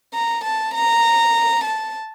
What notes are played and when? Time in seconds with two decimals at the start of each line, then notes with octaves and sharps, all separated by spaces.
0.14 A#5
0.44 A5
0.74 A#5
1.64 A5